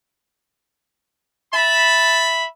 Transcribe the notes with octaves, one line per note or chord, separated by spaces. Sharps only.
E5 A5 B5